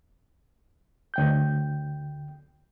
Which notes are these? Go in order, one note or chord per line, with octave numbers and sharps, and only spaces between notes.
D2 G5 G6